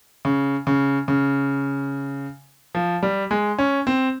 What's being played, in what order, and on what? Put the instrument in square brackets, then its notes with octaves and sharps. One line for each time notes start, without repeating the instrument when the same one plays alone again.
[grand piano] C#3
C#3
C#3
F3
G3
G#3
C#4
C4